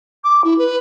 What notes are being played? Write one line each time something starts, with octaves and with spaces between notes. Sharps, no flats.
D6
E4
B4